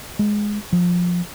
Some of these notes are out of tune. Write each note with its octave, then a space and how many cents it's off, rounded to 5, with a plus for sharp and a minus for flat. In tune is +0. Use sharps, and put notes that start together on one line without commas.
G#3 +5
F3 +15